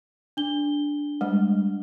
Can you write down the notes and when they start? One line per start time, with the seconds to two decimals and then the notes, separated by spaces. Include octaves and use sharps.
0.37 D4 G7
1.21 G3 G#3